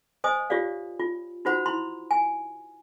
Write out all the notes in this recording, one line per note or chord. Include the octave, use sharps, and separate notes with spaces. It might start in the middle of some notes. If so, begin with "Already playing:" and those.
C5 D#5 G#5 D#6
F4 G4 C#5 D5 F5
F4
D#4 F4 F#4 C5 F#5 B5
E4 B5 C6
G#5